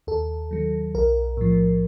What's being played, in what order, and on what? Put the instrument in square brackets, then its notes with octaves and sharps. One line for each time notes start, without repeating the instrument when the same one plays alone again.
[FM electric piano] D#2 A4
D#3 F#3
B1 A#4
A2 F3